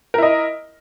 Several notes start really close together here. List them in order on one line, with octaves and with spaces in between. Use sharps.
A#4 E4 D#5